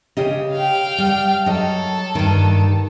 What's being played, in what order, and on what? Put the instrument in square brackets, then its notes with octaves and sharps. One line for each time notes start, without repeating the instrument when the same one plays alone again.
[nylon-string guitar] C#3 G4 D#5
[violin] F5 G5
[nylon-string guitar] G3
[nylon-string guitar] F#3 D#5 [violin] A4
[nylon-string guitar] G2 D#3